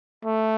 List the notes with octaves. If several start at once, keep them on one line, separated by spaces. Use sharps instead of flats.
A3